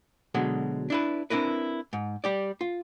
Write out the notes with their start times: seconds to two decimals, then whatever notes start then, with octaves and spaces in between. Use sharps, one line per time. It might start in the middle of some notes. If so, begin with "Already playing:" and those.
0.35 B2 D3 F#3 G#3
0.90 D4 E4 B4
1.30 C4 D4 E4 A#4 B4
1.93 G#2
2.24 G3 G4 D5
2.61 F4